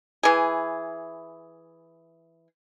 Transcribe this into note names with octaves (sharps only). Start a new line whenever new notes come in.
E3 G#4